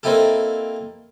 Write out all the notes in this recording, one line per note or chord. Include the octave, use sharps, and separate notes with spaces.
A#3 C4 D#4 E4 G4 A4